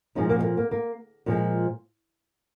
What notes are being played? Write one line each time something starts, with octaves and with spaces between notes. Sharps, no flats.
A#2 F3 G#3 D#4
A#3
G#3
A#3
A#3
A#3
A#2 F3 G#3